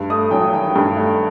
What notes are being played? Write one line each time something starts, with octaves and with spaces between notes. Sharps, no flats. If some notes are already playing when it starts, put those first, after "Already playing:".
Already playing: G2
A3 D#6
F#3 G5
D#3 G5
G2
A3